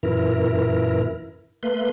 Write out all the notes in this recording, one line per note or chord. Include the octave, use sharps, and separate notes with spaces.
F#2 A#2 E3 E4 A#4
A3 A#3 B4 C6